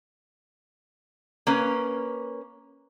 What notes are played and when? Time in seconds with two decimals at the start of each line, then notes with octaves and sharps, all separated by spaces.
1.47 A#3 C#4 B4